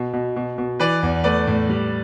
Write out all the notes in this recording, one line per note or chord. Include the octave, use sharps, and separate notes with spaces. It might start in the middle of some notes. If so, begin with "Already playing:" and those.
Already playing: B2
B2
B2
B2
E3 B4 D5
E2
A3 B4 D5
A2
G3